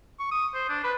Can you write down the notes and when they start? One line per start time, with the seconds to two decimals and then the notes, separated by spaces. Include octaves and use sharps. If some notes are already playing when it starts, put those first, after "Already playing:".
0.20 C#6
0.31 D#6
0.54 C5
0.69 D4
0.84 B4